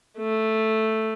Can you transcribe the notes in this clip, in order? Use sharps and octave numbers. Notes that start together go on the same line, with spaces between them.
A3